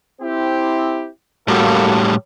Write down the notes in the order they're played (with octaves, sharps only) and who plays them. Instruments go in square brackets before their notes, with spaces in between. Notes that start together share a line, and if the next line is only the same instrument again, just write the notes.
[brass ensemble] C4 E4 G4
[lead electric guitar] A2 G3 [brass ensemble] A#3 F#4 A4